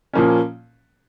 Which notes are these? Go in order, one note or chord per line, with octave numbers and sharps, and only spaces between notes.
A#2 F3 A#3 C#4